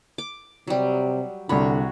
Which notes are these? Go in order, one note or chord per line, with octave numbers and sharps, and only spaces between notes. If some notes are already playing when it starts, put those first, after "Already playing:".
D6
C3 F#3 G3
C2 D3 F#4 C#5 B5